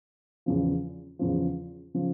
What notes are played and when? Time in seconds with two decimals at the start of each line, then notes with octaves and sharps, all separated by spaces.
0.46 E2 C#3 F3
1.19 E2 C#3 F3
1.94 C#3 F3